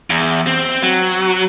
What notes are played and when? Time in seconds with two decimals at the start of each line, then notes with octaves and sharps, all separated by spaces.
0.10 E2
0.47 C4
0.82 F#3